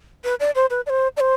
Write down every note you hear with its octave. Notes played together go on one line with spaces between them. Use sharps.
B4
D5
C5
B4
D5
C5
D5
C5